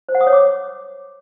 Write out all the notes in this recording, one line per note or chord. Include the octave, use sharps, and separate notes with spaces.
C5
F#5
D#6
C#5
D6